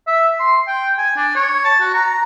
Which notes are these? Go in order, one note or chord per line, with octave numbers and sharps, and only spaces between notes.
E5
C6
G5
G#5
D4
C#5
A5
F#4
A#5